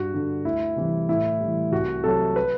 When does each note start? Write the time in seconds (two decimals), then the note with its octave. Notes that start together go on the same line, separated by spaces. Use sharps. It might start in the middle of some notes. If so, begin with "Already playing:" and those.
Already playing: G2 F#4
0.13 D3 G3
0.44 D2 E4
0.76 C3 E3 G3
1.09 A2 E4
1.41 E3 G3
1.72 C2 F#4
2.04 C3 F#3 A4
2.36 B4